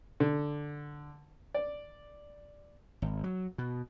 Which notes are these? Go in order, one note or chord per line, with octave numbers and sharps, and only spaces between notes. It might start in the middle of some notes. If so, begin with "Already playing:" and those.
D3
D5
G#1
F#3
B2